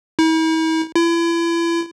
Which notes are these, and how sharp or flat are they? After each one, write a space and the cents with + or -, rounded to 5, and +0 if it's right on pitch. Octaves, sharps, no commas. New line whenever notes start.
E4 -45
E4 +35